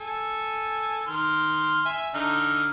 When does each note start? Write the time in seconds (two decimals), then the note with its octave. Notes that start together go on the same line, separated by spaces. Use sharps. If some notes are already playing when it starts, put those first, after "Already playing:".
0.01 A4 G#5
1.08 D#3 C6 F6
1.86 E5 G#5
2.15 D3 D#4 F6